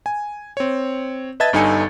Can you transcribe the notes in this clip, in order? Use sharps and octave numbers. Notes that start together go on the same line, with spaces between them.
G#5
C4 C#5
B4 D#5 E5 A5 G#6 A6
G1 G2 D#4 A4 G#5 C#7